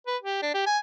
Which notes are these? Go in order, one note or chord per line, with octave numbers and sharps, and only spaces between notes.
B4
G4
D4
G4
G#5